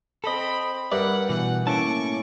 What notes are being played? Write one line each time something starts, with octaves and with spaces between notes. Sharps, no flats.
C4 A4 D#5 B5
G2 A#4 B4 D5 E5 F#5
B2 E3 F#5
A2 A#3 C#4 E4 A5 C#6 D6